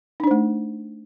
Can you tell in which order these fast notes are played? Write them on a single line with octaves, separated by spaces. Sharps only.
D#4 D4 C5 A3